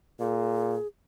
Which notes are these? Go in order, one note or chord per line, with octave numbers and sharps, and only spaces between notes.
A#2 G#4